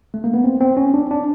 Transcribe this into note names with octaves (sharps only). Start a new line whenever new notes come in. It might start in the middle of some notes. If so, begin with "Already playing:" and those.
A3
A#3
B3
C4
C4
C#4
D4
D4